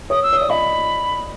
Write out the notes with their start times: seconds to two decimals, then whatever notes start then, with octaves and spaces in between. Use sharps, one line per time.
0.10 C#5 D#6
0.23 E6
0.33 C#5
0.37 D5 D#6
0.50 D#5 B5